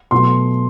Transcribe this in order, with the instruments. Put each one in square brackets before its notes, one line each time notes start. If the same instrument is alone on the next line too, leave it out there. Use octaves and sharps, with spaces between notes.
[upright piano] B2 F#3 A3 C6